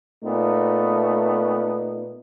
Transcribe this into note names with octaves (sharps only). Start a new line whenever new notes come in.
A#2 A3 B3 D#4